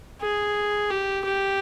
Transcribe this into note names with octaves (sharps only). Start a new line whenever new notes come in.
G#4
G4
G4